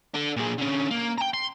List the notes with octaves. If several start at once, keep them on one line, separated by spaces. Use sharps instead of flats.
D4 A4
A#2 G#4
D3 C#4
A#3
G5 A#5
C6